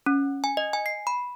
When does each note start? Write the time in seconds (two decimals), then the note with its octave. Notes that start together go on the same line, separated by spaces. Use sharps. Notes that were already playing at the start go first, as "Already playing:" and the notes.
0.06 C#4
0.44 G#5
0.57 D#5
0.73 G#5
0.86 C7
1.07 B5